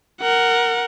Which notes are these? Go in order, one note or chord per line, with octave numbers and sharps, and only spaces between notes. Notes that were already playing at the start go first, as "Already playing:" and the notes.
A#4 F#5